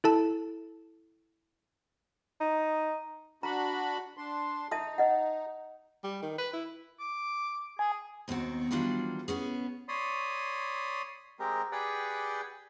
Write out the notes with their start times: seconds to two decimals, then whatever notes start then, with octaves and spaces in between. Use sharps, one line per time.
0.04 E4 A4 A5
2.40 D#4
3.43 D4 F#4 A#5 B5
4.17 D4 C6
4.71 D#4 E5 A5 D#6
4.98 D#5 F#5
6.04 G3
6.22 D#3
6.38 B4
6.53 E4
7.00 D6
7.79 G#4 G#5
8.28 D#2 B2 D#3 C4 F#4
8.71 D#3 E3 F#3 G3 D4 F4
9.28 B3 C#4 G#4
9.88 C#5 D5 B5 C6 D#6
11.39 G#3 C4 G4 A#4
11.72 G4 G#4 B4 D5 F#5 G5